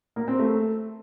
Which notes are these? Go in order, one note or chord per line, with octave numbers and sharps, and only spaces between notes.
A#3
C4
A3